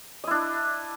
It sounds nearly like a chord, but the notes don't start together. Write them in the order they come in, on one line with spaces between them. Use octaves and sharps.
D#5 E4 D4